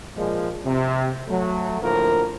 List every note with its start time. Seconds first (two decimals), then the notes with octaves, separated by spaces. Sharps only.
0.16 A#2 F3 G#3
0.65 C3
1.28 F#3 A3
1.81 D2 A2 F3 A#3 A#4